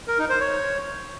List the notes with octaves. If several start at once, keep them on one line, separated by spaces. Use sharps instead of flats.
A#4
D#4
C5
C#5